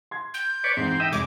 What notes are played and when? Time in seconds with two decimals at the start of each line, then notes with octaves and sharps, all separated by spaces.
0.11 C6 G#6
0.34 G6
0.64 B4 C#5 D5
0.77 G#2 E3 C4
1.00 D#5 E5 G5
1.12 F1 G#3 D6